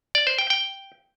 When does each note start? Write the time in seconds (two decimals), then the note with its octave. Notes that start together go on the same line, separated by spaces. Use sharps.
0.15 D5
0.27 C5
0.39 G5
0.50 G5